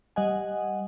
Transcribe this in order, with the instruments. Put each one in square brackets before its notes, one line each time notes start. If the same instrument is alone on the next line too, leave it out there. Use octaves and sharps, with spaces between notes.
[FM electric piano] G3 D#5 F#5 G#5